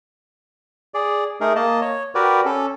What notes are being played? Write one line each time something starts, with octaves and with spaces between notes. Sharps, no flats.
G#4 D5
A3 D#4 G#4 A#4
A#3 D#5 A5
C#5
F#4 G4 A#4 B4 D5
C#4 A4